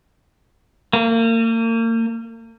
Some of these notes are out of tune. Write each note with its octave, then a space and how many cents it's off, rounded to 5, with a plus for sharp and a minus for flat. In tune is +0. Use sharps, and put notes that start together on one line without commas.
A#3 -35